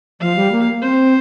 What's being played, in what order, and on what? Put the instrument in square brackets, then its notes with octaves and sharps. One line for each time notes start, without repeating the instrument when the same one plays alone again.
[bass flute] F3 [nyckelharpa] F5
[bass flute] G3
A#3
[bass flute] C4 [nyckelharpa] C5